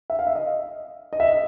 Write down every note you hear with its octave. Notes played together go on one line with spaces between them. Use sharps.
E5
F5
E5
D#5
D#5
E5
D#5